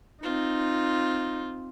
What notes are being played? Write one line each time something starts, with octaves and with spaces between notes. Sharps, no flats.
C4 D#4 F4